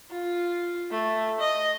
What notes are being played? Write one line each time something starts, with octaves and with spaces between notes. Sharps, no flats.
F4
A3
D#5